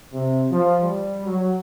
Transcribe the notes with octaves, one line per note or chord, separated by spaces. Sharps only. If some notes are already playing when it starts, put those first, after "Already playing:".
C3
F3
G3
F#3